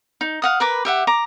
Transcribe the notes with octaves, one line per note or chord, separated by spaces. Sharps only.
D#4
F5 F#5 D#6
A#4 B4 D6
G4 E5 F#5
A#5 D6